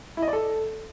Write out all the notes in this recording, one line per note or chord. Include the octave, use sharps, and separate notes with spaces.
E4
D#5
D5
A4